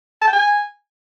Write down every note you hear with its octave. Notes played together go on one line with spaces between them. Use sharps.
A5
G5
G#5